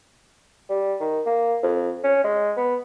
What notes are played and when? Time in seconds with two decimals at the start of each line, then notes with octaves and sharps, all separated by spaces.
0.69 G3
1.01 D#3
1.26 A#3
1.63 F2
2.04 C#4
2.24 G#3
2.57 B3